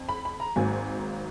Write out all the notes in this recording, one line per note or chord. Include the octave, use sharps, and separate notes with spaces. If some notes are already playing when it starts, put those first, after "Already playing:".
Already playing: F2
B5
B5
A#5
G#1 G#2 F#3 A#3 G#5